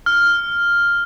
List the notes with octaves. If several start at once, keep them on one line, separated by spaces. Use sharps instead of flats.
F6